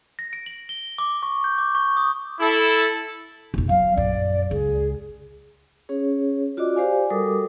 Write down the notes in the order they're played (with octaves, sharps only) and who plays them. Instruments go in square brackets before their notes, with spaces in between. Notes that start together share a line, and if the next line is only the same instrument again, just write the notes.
[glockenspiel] A#6
D7
F#7
G7
D6
C#6
G6
D6
C#6
D#6
[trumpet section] E4 A4
[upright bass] F1 B2
[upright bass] F#3 [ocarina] F5
[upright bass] A#1 F#2 [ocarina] D5
[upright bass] C#2 [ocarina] G#4
[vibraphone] C#4 G#4 C#5
F4 F#4 D5 D#5 D6
G4 C5 D5 F5 G#5
G3 F#4 A4 A#4 D6 D#6